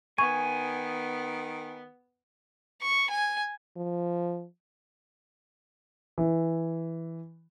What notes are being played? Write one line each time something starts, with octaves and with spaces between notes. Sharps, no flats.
D#3 B3 G#5 C#6
C#6
G#5
F3
E3